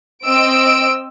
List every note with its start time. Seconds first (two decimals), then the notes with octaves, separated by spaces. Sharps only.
0.24 C4 D#5 E6 D7